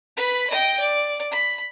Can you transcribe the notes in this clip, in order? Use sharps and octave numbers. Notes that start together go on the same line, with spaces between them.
B4 B5
D#5 G5
D5
B5